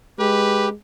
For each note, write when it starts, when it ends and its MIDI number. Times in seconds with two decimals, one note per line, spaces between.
0.19 0.73 56
0.19 0.69 67
0.19 0.67 71